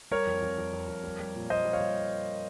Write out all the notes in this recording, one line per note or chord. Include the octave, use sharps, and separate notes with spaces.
G3 A#4 C#5
F2
F2
F2
F2
F2
G3
G3
A#2
A#2 C5 D#5
G3
C#5 F5
G3